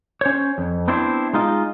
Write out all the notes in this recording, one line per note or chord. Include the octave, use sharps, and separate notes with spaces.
C#4 C5 C#5
F2
B3 C4 D4 E4 C5
G#3 D#4 F4 D#5